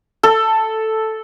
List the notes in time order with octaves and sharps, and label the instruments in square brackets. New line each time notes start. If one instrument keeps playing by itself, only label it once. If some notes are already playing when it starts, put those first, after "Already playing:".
[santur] A4